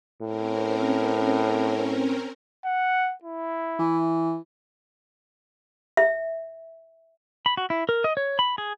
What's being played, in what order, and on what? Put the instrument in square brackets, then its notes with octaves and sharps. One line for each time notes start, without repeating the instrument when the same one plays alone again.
[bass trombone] A2 [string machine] C4 C#4 A#4
[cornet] F#5
E4
[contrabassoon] E3
[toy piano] E5
[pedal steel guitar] B5
F#4
E4
A#4
D#5
C#5
B5
G#4